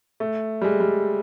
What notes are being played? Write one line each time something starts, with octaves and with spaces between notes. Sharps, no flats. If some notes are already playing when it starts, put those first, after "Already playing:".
A3
G3
G#3
G3